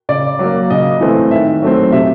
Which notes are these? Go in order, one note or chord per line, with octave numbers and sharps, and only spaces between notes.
C#3 D5
F#3 A#3
C#3 D#5
E3 A3 C4
D#3 E5
F#3 A3 C4
C3 E5